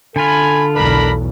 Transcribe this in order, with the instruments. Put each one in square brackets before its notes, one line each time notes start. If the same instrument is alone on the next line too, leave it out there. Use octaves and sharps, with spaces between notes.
[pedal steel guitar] D3 F4 [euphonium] A4 [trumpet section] G#5 B5
[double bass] B1 E2 [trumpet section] D4 A#4 B5